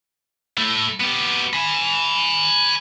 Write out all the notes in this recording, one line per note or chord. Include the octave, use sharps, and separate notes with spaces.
A3 E4
B3 G4
G#5 B5